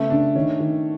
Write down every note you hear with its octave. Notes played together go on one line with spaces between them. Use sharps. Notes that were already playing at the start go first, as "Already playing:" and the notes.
Already playing: C#3 A3 B3
C#3 D4
D#3 C#4
D#3